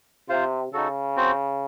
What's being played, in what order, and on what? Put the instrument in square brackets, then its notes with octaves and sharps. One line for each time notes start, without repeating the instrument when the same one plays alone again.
[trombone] C3 [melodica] F4 C5 F5
[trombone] C#3 [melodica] D#4 F#4 A4
[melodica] C4 F#4 C5